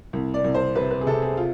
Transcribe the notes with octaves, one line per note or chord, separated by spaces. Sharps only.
C2
D5
C2
C5
C3 B4
B4
G#4
C3 A4
G#4
F4